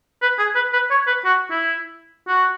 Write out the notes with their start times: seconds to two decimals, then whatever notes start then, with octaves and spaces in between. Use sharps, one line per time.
0.22 B4
0.39 G#4
0.55 B4
0.73 B4
0.90 C#5
1.07 B4
1.25 F#4
1.51 E4
2.27 F#4